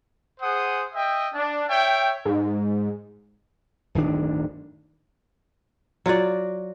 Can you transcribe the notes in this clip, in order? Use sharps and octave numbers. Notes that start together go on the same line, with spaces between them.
G#4 C5 F#5 D#6
D#5 E5 G5
D4
C#5 E5 G5
G#2
D1 G1 D#3 D4
F#3 F4 F#4 D5